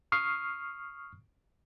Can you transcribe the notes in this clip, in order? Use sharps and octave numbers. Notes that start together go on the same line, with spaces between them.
C#6 D#6 F6 C7